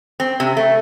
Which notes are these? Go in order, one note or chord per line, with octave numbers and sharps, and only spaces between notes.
C4
C3
A3